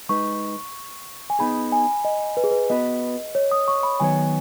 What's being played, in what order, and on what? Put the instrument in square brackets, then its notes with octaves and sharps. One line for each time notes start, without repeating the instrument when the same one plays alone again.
[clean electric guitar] G#3 D#4 B4 [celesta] C#6
[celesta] G#5
[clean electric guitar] B3 D#4 G#4 [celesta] B5
[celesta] G#5
D#5
B4
G#4
B4
[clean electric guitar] B3 F#4 B4 [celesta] D#5
[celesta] C#5
D#6
C#6
B5
[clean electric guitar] D#3 F#3 B3 G#4 C#5 [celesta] G#5